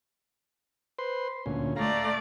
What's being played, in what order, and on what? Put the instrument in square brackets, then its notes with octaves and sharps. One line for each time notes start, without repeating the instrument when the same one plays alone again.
[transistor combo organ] B4 C5 C6
D2 A#2 C#4
[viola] A3 D5 [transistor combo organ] F5 A#5